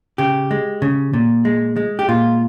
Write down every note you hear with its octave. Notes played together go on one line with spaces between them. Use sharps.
C#3 G4
G#3
C#3
A#2
G#3
G#3
G4
A#2 F4